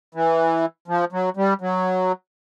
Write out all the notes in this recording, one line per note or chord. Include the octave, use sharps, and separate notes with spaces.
E3
F3
F#3
G3
F#3